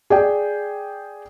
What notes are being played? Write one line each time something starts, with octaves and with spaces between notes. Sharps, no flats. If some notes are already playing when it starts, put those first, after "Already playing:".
G#4 D5 G5